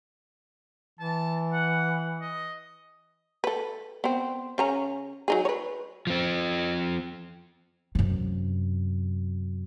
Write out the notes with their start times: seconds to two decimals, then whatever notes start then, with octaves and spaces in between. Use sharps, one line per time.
0.99 E3 A5
1.53 F#5
2.21 D#5
3.44 A4 B4
4.04 B3 C4
4.58 C#3 C#4 A#5
5.28 F#3 D#4 G#4
5.45 B4 C#5
6.07 F3 C4
7.95 F#2 C3